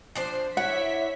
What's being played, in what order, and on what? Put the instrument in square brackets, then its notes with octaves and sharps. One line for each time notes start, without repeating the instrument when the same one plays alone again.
[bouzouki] F3 D4 C5
[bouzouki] D4 E4 [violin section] C#5 E5 B6 [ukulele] F#5